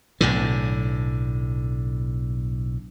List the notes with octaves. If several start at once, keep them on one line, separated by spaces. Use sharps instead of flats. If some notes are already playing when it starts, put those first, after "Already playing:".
B1 A2 D3